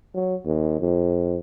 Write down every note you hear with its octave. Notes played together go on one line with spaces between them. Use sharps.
F#3
D#2
F2